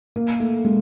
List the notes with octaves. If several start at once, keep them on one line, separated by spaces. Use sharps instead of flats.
A#3
A3
G#3